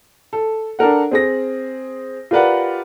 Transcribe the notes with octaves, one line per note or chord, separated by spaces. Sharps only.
A4
D4 A4 A#4 F#5
C4 G#4 A#6
F4 G4 A#4 B4 D5 F#5